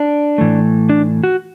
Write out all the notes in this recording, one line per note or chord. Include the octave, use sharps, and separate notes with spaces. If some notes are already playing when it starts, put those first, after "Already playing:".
Already playing: D4
A2 E3 A3
D4
F#4